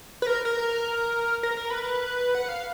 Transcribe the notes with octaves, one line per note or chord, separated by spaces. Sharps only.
B4
A#4
A#4
A#4
A#4
B4
F#5
F5